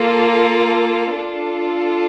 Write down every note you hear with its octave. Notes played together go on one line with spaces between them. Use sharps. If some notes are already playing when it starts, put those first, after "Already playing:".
Already playing: A#3 F4 A4
A#4
D4 F4 A4